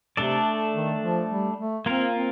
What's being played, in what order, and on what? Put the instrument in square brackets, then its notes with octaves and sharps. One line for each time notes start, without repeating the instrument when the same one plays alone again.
[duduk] C3 [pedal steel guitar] A3 D4 A4 D5
[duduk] D#3
F3
G3
A3
[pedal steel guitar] A#3 F4 A#4 [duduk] C4
[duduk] C4